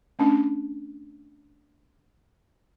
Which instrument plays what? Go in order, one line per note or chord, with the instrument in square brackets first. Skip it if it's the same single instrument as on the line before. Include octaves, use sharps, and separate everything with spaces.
[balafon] A3 C#4 D4